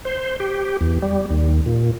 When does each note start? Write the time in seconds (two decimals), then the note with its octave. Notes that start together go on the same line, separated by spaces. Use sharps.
0.05 C5
0.40 G4
0.81 E2
1.02 G3
1.31 D#2
1.66 A#2